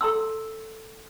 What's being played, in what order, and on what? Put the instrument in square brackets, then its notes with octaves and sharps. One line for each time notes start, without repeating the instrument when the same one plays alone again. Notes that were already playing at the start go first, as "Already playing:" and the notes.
[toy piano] A4 A#5 C6 E6